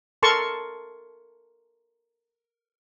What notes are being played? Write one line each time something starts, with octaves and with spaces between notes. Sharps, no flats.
A4 A#4 A5 C6 C#6